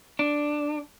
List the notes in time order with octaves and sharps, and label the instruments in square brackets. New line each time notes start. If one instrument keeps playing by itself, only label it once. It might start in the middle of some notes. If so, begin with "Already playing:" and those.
[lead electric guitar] D4